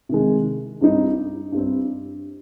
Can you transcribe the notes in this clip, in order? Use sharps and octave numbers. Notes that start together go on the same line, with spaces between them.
C3 D#3 G#3
G2 G3 C4 D#4
G2 G3 C4